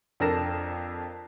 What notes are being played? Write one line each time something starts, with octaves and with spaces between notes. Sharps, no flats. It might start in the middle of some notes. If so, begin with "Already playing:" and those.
F2 D4 A4 A#4 A#6 E7